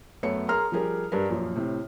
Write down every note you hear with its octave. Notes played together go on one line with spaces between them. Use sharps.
F#2 A3 B3 C#5 C#7
G#4 A#4 A#5 C6 F6
F3 G3 G4 G#4 A#4
G2 G3 A#4 B4
F#2 A#2 F3
A2 C3